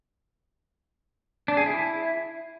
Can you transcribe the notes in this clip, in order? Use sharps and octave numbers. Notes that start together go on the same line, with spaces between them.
D4
G#4
E4